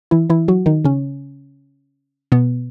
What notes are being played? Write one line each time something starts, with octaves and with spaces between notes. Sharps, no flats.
E3 E4
E3 E4
F#3 F#4
D#3 D#4
C#3 C#4
B2 B3